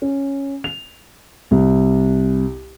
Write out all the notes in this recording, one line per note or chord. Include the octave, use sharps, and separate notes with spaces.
C#4
F7
C2